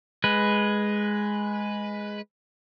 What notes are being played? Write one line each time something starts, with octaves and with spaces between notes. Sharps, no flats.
G#3 B4